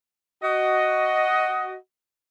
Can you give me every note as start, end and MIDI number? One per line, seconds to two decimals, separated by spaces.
0.43 1.74 66
0.43 1.74 75